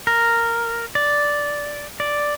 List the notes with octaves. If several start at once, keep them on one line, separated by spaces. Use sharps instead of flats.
A#4
D5
D5